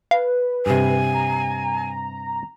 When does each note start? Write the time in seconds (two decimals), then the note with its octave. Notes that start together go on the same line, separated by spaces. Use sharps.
0.11 B4 F5
0.66 G2 C3 G#5
1.14 A#5